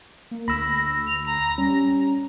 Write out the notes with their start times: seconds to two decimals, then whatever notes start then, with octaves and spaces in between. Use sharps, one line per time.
0.31 A#3
0.48 D2 B5 E6 A#6
1.07 F7
1.26 A#5
1.58 G3 C#4 A#5